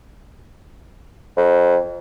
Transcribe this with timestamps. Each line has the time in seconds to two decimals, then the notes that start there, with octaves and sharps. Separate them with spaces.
1.37 F2